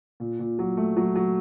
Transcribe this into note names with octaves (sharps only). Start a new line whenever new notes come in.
A#2
A#2
F#3
A3
F#3
F#3